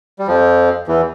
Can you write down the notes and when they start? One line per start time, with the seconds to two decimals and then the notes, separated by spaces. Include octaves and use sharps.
0.19 G3
0.27 F2 F3
0.87 E2 E3